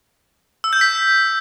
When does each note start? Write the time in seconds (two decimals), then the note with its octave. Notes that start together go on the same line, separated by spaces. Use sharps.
0.64 E6
0.73 G6
0.81 B6